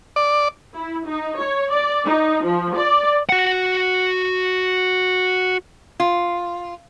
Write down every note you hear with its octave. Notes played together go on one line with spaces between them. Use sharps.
D5
E4
D#4
C#5
D5
D#4
F3
D5
F#4 F#5
F4